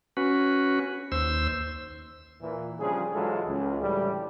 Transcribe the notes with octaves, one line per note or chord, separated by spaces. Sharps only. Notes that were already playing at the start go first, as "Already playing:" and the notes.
C#4 F#4 B4
D#2 C5 E6
A#2 E3
C#3 F3 G3 D4 G#4
G#2 E3 F#3 G#3 F4 A4
C#2
A2 D3 E3 F#3 G3